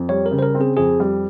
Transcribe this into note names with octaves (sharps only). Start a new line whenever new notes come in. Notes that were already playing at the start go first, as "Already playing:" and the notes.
Already playing: F2
G3 C#5
A#4
C#3
C5
A#4
C4
G#4
F2 G#4
G3